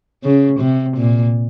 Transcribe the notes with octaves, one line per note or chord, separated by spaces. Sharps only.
C#3
C3
A#2